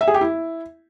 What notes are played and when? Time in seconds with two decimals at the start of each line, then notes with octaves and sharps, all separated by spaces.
0.01 E5
0.08 G#4
0.14 G4
0.21 E4